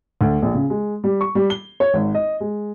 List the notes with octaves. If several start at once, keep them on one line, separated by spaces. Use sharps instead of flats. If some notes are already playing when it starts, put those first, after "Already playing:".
D2
A#1
C#3
G#3
G3
C#6
G3
G7
C#5
G#1
D#5
G#3